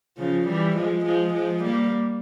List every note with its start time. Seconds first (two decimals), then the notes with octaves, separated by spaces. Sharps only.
0.18 C#3 F3
0.47 E3 G3
0.76 F3 G#3
1.05 F3 G#3
1.34 F3 G#3
1.63 G3 A#3